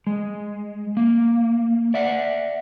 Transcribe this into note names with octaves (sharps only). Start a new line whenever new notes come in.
G#3
A#3
D5 E5 F#5